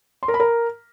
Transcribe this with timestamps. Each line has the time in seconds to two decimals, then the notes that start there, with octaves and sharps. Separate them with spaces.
0.23 C6
0.28 A#4
0.34 B5
0.40 A#4